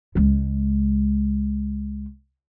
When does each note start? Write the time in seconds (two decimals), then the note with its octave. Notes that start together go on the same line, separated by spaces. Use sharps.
0.15 C#2 G#3